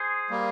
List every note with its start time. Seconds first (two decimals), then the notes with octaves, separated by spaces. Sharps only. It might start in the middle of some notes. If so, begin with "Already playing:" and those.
Already playing: G#4 C5
0.30 G3 A#3